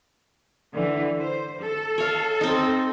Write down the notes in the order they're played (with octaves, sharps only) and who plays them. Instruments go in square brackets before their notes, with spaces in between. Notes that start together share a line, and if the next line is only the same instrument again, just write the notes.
[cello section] D3 E3
C5
A4
[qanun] C#5 F5
C4 D#4